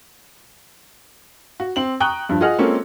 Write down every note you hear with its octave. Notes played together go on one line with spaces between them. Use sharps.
F#4
C4 F#7
G5 A#5 C#6 D#6 F#6 G7
G2 F3
F4 G#4 D#5 F#5 F6
G#3 A#3 C4 C#4 F4 A4